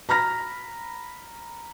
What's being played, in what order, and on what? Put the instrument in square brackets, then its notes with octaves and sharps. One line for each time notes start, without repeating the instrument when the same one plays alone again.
[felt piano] A#5 B5 F6 A#6